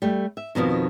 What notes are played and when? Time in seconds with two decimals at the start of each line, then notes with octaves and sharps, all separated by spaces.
0.02 G3 A3
0.37 E5
0.55 F2 G#2 B2 D#3